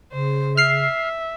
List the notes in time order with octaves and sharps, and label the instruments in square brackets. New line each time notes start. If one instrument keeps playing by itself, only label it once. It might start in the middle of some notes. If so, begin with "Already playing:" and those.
[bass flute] C#3 [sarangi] C5
[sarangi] E5 [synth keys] F6 C7